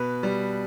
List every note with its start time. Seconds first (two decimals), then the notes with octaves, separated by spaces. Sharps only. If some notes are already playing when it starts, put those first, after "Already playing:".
Already playing: B2 B4
0.23 G3